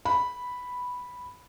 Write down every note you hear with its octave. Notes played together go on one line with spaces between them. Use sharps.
B5